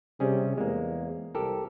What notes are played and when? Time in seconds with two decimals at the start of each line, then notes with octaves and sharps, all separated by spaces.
0.20 C3 G3 C#4 G#4
0.58 E2 G#3 A#3
1.35 C2 G4 A4 A#4